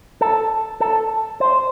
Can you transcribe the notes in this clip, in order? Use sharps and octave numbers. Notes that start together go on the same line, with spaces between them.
A4
A4
C5